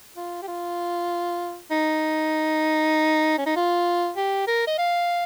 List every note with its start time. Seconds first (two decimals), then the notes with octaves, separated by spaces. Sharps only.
0.16 F4
0.42 G4
0.48 F4
1.71 D#4
3.38 C#4
3.46 D#4
3.56 F4
4.17 G4
4.47 A#4
4.67 D#5
4.78 F5